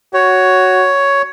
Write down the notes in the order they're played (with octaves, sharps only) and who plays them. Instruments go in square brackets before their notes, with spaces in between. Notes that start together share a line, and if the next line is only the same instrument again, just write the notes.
[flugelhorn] F#4 [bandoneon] C#5